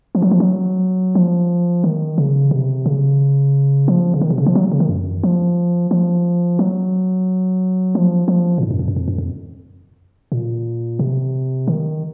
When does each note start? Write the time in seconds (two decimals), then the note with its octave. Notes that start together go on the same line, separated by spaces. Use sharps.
0.15 F3
0.22 F#3
0.31 F3
0.40 F#3
1.15 F3
1.84 D#3
2.18 C#3
2.51 C3
2.86 C#3
3.88 F3
4.14 C#3
4.21 D#3
4.30 C3
4.38 C#3
4.46 F3
4.55 F#3
4.72 C#3
4.80 D#3
4.89 F#2
5.23 F3
5.91 F3
6.59 F#3
7.95 F3
8.28 F3
8.58 A#2
8.63 G#2
8.71 F#2
8.79 F2
8.88 F#2
8.96 F2
9.08 F#2
9.18 F2
10.32 A#2
10.99 C3
11.68 D#3